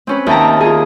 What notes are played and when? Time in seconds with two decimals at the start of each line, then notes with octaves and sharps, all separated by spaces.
0.07 C4 C#4 B4
0.26 D#2 E5 G5 A5 A#5
0.61 F4 G#4